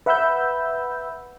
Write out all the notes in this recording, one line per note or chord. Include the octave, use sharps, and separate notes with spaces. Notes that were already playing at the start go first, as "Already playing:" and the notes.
B4 E5 F#5 B5 E6 G6